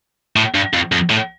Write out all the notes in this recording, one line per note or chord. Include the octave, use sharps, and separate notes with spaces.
A2
G2
F2
F2
A2